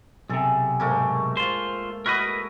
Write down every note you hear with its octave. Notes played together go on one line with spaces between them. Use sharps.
B1 C3 G#4 A4
G#2 A3 A#3
F4 C5
E4 F#4 A#4 B4 D#5